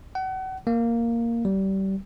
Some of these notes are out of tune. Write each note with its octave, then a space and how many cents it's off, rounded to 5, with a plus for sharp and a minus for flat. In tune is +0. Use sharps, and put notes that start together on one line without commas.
F#5 +35
A#3 -5
G3 -25